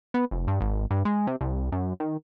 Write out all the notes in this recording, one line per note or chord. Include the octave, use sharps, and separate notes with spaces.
B3
F1
G2
G#1
G2
G#3
C3
C2
F#2
D#3